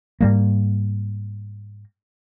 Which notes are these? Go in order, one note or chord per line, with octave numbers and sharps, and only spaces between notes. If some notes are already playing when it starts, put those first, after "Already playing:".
G#2 G3 A#3